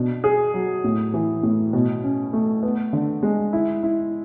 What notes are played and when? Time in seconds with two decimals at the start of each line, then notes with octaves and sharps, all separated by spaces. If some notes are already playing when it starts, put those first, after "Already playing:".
Already playing: B2 D4
0.24 G#4
0.54 F#3
0.84 A2
1.14 E3
1.43 A2
1.73 B2
2.03 C#4
2.33 A3
2.63 B3
2.93 D3
3.23 G#3
3.53 E4
3.83 E4